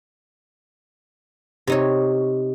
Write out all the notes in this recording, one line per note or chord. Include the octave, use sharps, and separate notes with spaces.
C3 D#4 C#5